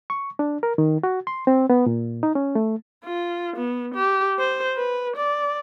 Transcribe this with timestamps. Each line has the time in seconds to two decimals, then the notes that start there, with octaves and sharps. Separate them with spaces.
0.10 C#6
0.39 D4
0.63 A#4
0.78 D#3
1.03 F#4
1.27 C6
1.47 C4
1.70 B3
1.86 A#2
2.23 D#4
2.35 C#4
2.55 A3
3.05 F4
3.57 B3
3.95 G4
4.39 C5
4.77 B4
5.17 D5